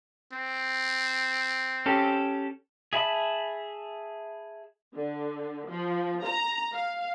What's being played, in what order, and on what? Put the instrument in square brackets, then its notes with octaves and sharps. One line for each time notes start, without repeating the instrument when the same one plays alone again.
[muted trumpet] C4
[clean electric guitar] C#4 G4 A4
[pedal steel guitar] G#4 E5 A5 B5
[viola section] D3
F3
A#5
F5